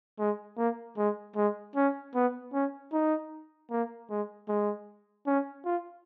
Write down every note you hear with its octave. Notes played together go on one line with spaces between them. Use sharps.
G#3
A#3
G#3
G#3
C#4
B3
C#4
D#4
A#3
G#3
G#3
C#4
F4